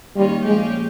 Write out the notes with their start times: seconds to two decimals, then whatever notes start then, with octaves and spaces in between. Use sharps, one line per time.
0.16 D#2 D#3 G3 A#3 C#4 F4
0.45 A#2 F3 G#3 A#3 C#4 G4